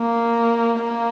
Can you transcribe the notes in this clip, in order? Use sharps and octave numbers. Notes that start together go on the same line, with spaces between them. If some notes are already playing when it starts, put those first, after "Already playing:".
Already playing: A#3
A#3